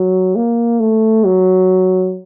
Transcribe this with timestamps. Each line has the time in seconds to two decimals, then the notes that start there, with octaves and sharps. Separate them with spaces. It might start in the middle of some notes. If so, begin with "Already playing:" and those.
Already playing: F#3
0.36 A#3
0.80 A3
1.25 F#3